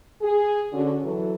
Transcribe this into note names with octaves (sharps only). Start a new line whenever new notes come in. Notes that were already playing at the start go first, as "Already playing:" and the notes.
G#4
D3 C#4 F#4
E3 F#3 A4